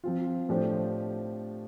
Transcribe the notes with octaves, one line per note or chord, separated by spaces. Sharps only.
F3 C4 F4
A2 F3 D4 G4 C5